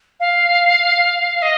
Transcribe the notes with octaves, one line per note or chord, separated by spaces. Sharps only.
F5
D#5